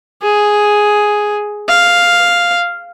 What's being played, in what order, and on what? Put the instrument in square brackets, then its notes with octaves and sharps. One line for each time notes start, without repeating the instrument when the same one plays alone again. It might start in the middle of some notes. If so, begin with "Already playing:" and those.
[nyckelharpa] G#4
F5